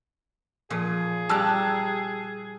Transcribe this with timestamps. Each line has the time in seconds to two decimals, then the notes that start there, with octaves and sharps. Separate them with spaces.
0.70 A#2 F3 G#4
1.29 G3 A5 A#5 E6 F#6